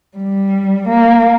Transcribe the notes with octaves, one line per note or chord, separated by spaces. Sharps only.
G3
A#3